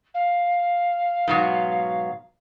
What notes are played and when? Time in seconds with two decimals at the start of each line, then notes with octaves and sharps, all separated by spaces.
0.14 F5
1.28 G#2 B2 F#3